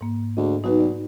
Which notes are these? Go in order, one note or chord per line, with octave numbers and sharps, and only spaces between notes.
G#2 A#3
D2 G#4 D#5
B1 D#4 F#4 B4
D5